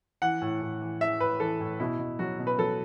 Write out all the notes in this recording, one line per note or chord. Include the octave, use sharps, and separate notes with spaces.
E3 F#5
A2
A2
E3
E3 E5
A2 B4
E3 A4
A2
B2 E4
B2
F#3 F#4
B2
B4
F#3 A4